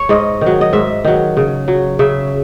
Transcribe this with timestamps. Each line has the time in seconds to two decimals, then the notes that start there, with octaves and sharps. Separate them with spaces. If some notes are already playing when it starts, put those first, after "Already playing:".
Already playing: C#5
0.09 G#2 D#5
0.41 D#3
0.46 F#3
0.61 D#5
0.73 G#2 E5
1.05 D#3 F#3
1.37 C#3
1.68 F#3
1.99 C#3 E5